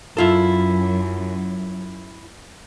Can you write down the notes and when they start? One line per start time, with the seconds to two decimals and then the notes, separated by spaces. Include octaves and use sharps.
0.17 F#2 E4 F4 A4